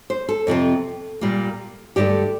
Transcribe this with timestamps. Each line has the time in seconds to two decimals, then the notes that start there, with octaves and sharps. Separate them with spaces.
0.10 C5
0.29 A4
0.47 F2 C3 F3 C4
1.21 A#2 G3 A#3
1.96 G2 D3 A3 G4